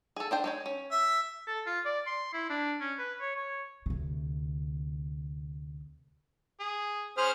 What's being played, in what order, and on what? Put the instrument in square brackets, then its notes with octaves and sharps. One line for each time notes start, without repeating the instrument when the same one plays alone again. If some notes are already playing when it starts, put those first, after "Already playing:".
[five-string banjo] G#4 A4
D4 C5 G5
G#3 D#4 C#5
C#4
[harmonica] E5
[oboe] A4
F4
D5
C6
E4
D4
C#4
B4
C#5
C#5
[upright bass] D2 C3
[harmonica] G#4
[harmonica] C#4 G#4 [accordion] C5 F6